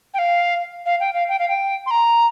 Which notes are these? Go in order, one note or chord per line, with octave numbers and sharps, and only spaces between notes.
G5
F5
F5
G5
F5
G5
F5
G5
C6
A#5